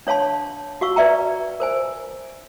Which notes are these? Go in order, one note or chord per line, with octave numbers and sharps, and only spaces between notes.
D4 C#5 F5 A5 C6
F#4 F5 C#6 E6
B4 D5 E5 G5 A#5
A#4 C5 G#5